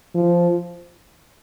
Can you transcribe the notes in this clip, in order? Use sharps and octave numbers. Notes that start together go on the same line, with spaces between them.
F3